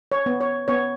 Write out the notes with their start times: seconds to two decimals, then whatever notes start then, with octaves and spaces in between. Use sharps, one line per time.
0.12 C#5
0.26 B3
0.40 C#5
0.68 B3 C#5